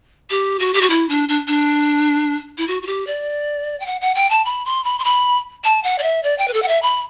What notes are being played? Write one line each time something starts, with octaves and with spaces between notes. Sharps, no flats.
G4
F#4
G4
F#4
E4
D4
D4
D4
E4
F#4
F#4
G4
D5
G5
F#5
F#5
G5
A5
B5
C6
B5
C6
B5
A5
F#5
D5
E5
D5
G5
B4
A4
F#5
E5
B5